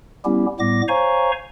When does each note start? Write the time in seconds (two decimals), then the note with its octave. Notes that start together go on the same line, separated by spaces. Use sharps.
0.25 G3 B3 C#4 E4 G4
0.59 A2 G3 B3 D6 A#6
0.88 C5 C#5 F5 G#5 A#5 C#6